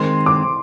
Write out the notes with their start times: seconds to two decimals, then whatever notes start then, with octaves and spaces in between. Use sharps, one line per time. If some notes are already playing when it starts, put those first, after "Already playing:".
Already playing: D#3 G#3 C4 C6
0.26 D6